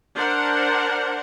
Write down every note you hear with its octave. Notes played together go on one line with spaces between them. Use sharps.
D4 A#4 C5 F#5